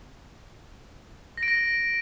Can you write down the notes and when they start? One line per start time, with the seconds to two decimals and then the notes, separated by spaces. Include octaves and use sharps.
1.37 A#6
1.43 D7
1.48 A#6